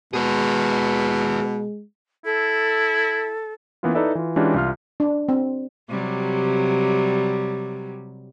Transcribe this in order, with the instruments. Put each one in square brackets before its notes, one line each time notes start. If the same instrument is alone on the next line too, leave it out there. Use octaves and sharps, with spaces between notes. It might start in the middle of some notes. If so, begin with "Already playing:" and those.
[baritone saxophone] B2 [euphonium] G#3 [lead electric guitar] G#4 B4
[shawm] E4 [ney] A4
[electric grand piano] E3 A#3 B3 C#4 F4
D#4 E4 A4 B4 D5 E5
E3 F4
E3 G#3 C#4 D4 F4 G4
C2 F4 F6
[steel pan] D4
C4
[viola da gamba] C3 F#3 G3